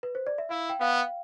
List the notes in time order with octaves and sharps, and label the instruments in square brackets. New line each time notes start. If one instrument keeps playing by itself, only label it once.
[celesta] B4
C5
D5
E5
[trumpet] E4 [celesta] F5
[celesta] G5
[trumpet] B3 [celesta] F5